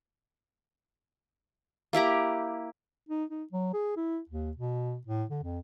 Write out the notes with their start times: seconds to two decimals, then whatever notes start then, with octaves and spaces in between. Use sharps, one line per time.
1.93 A#3 E4 G4 A#5
3.09 D#4
3.30 D#4
3.52 F#3
3.73 G#4
3.96 E4
4.29 D#2
4.57 B2
5.06 A2
5.29 D3
5.43 F2